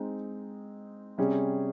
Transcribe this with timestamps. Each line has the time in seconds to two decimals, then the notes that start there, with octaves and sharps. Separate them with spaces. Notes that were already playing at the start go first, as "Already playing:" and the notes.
Already playing: G#3 C4 D#4
1.18 C3 G3 C#4 G#4